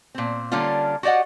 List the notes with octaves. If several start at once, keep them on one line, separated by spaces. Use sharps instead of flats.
A#2 C4
D3 G3 A#3 C#4 D4 F4
F#4 G4 D5 D#5 F#5